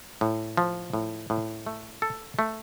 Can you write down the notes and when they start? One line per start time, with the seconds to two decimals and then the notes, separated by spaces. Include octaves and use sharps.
0.21 A2
0.57 F3
0.93 A2
1.30 A2
1.67 A3
2.02 A4
2.39 A3